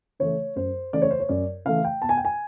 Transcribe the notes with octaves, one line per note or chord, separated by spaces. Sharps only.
C#3 E3 A3 C#5
F#2 C5
C#3 E3 A3 D5
C#5
C5
C#5
F#2 D5
C#3 E3 A3 F5
G5
B2 A5
G#5
G5
G#5